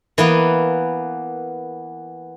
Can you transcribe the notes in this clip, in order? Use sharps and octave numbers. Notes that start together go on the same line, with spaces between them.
E3 A#3 B3